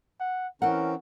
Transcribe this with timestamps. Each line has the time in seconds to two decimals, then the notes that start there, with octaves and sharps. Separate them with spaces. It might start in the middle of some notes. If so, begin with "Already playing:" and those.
0.20 F#5
0.62 E3 C4 C#4 A#4 F#5